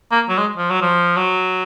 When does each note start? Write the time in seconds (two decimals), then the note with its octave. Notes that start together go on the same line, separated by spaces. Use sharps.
0.11 A#3
0.29 F#3
0.38 G#3
0.58 F3
0.70 F#3
0.82 F3
1.17 F#3